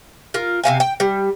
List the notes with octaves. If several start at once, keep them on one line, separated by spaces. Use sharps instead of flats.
F4 A#4
C3 C4 F5 G#5
G5
G3